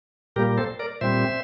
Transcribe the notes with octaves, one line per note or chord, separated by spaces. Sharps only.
A#2 G3 A#3 G4 A#4
A4 C5
A#4 D5
A#2 G3 C4 C5 E5